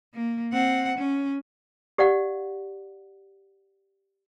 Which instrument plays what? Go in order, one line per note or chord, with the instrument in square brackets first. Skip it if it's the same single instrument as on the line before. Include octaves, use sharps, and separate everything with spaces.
[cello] A#3
C4 F#5
C#4
[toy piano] G4 D5 F5 F#5